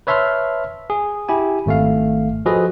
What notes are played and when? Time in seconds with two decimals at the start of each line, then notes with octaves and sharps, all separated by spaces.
0.07 B4 C#5 E5 A5 C6 F6
0.90 G#4
1.29 E4 G4 G#5
1.66 G#1 A3 F5
2.46 F3 F#4 G#4 A4 B4 D#5